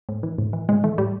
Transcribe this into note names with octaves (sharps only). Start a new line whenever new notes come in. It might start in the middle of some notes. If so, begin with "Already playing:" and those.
A2
E3
A2
E3
A2 G#3
E3 A3
A2 G3